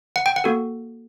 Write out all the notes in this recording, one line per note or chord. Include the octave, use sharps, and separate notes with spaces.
F#5
G5
F#5
A#3 F#4 A4